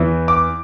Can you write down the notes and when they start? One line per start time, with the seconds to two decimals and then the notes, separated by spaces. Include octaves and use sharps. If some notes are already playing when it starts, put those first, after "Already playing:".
Already playing: E2 E3
0.28 D6